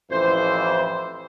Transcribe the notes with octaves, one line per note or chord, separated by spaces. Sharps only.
A1 F2 E3 C5